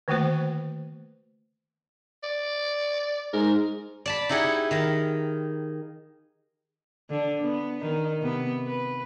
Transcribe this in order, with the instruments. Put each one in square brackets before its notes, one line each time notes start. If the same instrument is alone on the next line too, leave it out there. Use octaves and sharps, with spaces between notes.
[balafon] D3 D#3 A3 A#3 F#4 C5
[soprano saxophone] D5
[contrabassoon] G#2 [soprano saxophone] A#4
[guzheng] D5 A5 B5
D#4 E4 G4 G#4 F#5
D#3 F5 A#5
[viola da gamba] D3 D4
B3
D#3 D#4
C3 B3
B4